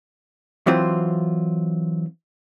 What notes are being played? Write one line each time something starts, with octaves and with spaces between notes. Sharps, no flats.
E3 F#3 C4 F4